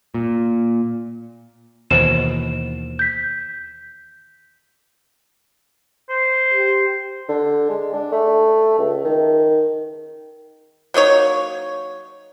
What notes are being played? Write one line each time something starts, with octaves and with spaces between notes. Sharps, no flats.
A#2
D#2 B2 E3 C5 E7
G6 B6
C5
G4
D3
G#3
D4
A3
C#2
D#3
F#3 A#3 D#4 C#5